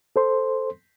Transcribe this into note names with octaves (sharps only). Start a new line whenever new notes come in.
A4 C5 C6